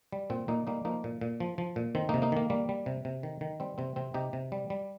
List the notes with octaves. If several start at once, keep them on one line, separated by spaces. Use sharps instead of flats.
G3
A#2 C4
A#2 A#3 D#4
G3 A#3 D#4
F3 A#3 D#4
A#2
A#2
F3
F3
A#2
D#3 C4
A#3 D#4
C3
A#3 D#4
D#3 A#3
G3 A#3
G3
C3
C3
D#3
D#3
G3 C4
C3 C4
C3 C4
C3 D#4 G4
C3
G3
G3